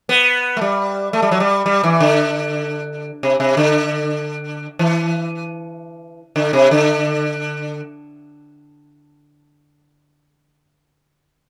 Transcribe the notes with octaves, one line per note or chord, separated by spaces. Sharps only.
B3
A3
G3
A3
G3
F#3
G3
G3
E3
D3
C3
C3
D3
E3
D3
C3
D3